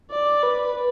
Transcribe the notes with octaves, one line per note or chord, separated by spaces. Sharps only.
D5
B4